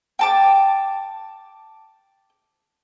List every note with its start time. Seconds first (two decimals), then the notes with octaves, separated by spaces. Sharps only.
0.19 G5 A5 D6